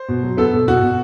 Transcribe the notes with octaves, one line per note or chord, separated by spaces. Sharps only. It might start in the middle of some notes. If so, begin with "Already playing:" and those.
Already playing: C5
B2
F#3
B3 A4
B2
B2 F#4
B2